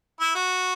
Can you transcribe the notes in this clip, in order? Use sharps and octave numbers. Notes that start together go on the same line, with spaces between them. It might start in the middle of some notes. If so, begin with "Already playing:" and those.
E4
F#4